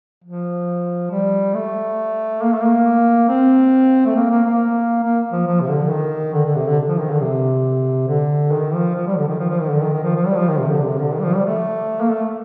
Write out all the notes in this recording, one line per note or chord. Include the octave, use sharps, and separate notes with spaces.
F3
G3
A3
A#3
A3
A#3
C4
A3
A#3
A#3
A#3
A#3
F3
F3
C3
D3
D#3
D3
D3
C3
D3
F3
D#3
D3
C3
D3
D#3
F3
F3
G3
D3
D#3
F3
F3
D#3
D3
D#3
D#3
F3
F3
G3
F3
D#3
C3
D3
C3
D3
D#3
G3
F3
G3
A3
A#3
A3